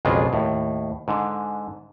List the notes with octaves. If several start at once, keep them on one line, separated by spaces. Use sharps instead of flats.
B1 F2 C#3 G#3 D4 F4
D#2 A2
G#2 D3